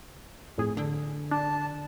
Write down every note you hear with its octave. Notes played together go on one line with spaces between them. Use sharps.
F2 A2 G#4
D3
D4 A5